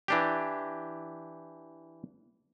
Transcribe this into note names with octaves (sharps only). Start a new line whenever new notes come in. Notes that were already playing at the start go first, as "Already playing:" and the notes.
E3 D4 G4